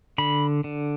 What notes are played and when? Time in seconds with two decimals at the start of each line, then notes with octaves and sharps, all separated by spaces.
0.18 D3 B5
0.64 D3